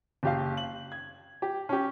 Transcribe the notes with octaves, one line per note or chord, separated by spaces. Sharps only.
F#1 G4 F5
F#7
G#6
G4
C#4 G4